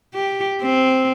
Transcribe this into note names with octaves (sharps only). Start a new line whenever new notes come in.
G4
C4